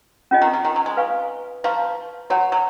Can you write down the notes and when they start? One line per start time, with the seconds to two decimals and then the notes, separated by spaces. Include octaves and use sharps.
0.31 C#4 F4 G#4 D#5 G#5
0.41 D#3
0.53 C#3
0.65 D#3
0.76 F#3
0.86 G#3
0.97 B4 F5 G#5 C#6
1.64 F3 B4 F5 A#5 C#6
2.30 F#3 F#4 C#5 F#5
2.52 F#3